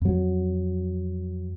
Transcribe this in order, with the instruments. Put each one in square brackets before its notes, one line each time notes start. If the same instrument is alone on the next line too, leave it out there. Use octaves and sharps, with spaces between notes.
[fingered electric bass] F2 F#3